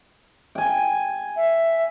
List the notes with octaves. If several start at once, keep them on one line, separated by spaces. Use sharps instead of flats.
G5 G#5
E5